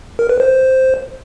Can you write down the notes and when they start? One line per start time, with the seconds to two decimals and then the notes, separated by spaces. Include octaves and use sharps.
0.19 A#4
0.29 B4
0.40 C5